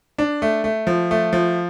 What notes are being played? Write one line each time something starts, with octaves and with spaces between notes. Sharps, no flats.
D4
A3
A3
F3
A3
F3